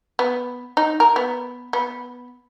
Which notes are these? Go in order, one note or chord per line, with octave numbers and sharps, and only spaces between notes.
B3
D#4
A#4
B3
B3